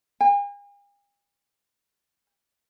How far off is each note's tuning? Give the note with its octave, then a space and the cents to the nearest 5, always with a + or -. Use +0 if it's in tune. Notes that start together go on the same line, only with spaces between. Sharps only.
G#5 -45